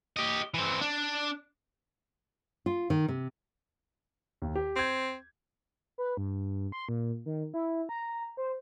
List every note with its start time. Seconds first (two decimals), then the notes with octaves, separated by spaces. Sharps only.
0.16 G4 D#5
0.54 E3 C4
0.81 D4
2.66 F4
2.90 D#3
3.09 C3
4.42 D#2
4.55 G4
4.76 C4 G6 G#6
5.98 B4
6.17 G2
6.72 C6
6.89 A#2
7.26 D#3
7.54 E4
7.89 A#5
8.37 C5